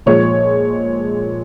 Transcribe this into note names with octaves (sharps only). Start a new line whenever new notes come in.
A#2 F3 G#3 C#5